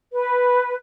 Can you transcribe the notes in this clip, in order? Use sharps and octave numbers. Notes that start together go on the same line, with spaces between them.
B4